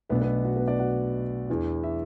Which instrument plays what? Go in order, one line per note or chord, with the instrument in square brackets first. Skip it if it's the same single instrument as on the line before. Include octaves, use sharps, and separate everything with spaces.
[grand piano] B1 B2 A3 B3 D4 B4
B3 B4
F#4
B3 B4
D4 D5
F#4 F#5
E2 E3 D4
E4 E5